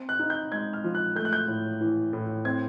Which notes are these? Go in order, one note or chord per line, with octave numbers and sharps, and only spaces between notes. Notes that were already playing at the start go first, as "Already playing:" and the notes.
Already playing: C4
F#6
D#4
G6
G#3 G#6
F6
F3
F#6
A3 G6
F#6
G6
A2
E3
A2
C4 G#6